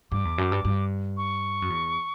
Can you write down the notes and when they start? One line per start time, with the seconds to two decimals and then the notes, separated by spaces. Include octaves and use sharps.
0.11 G2 D6
0.25 E2
0.38 F#2
0.52 G2
0.65 G2
1.17 C#6
1.62 F#2
1.70 E2